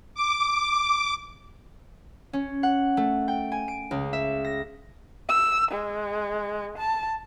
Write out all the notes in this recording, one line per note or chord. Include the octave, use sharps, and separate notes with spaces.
D6
C#4
F#5
A3
G5
G#5
D7
C#2
E5
A#6
E6
G#3
A5